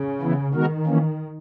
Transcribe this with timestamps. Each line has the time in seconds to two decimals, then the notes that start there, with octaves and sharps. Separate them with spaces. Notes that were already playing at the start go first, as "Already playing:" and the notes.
Already playing: C#3
0.21 E3 B3 E4
0.54 D#3 G#3 B3 F#4 A#4
0.86 E3 A#3 C#4